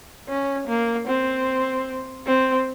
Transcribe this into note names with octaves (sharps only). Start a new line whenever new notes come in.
C#4
A#3
C4
C4